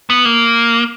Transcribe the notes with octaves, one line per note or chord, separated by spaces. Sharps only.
B3
A#3